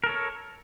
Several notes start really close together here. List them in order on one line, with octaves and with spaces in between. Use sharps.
A#4 A4 C#5